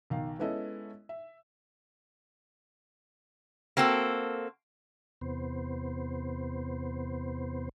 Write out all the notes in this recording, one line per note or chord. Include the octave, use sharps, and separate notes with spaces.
B1 D#3 F5
G#3 B3 C#4 E4 A4 D#5
E5
A#3 C4 F#4 A4
E2 C3 B3 C5